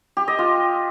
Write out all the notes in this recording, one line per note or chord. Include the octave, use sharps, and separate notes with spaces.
G4
D#5
F4